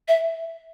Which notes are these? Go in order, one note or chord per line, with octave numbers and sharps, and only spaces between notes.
E5